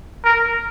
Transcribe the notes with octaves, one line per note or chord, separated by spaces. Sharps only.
A#4